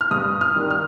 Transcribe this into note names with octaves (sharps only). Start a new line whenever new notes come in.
F6
G2 D#6
F6
D#3 G3
F6